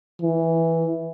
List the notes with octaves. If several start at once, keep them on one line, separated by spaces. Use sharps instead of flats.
E3